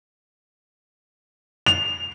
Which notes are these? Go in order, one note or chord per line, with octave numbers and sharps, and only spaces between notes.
F7